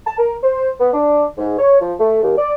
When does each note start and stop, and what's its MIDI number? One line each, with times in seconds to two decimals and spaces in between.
0.06 0.14 81
0.18 0.34 70
0.42 0.70 72
0.79 0.91 59
0.93 1.24 62
1.38 1.56 44
1.59 1.80 73
1.81 1.93 53
1.98 2.20 57
2.22 2.36 39
2.37 2.54 74